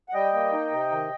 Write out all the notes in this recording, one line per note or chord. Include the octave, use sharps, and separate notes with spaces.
F#5
G3 D#5 G5
A#3
D#4
C3
D#3